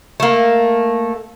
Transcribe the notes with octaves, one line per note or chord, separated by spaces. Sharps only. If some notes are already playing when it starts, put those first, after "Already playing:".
A3 A#3